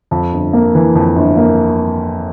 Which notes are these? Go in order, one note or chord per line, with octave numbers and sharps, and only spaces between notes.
F2
G1
A#3
E3
F2
G1
A#3